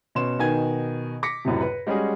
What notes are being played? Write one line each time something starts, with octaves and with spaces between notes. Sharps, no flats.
B2 C#4 C6 E7
B2 D#3 G#5 G#6
D6 A#6 B6 C#7
C#2 F#2 A2 C3
B4
G3 G#3 C#4 F#4 G#4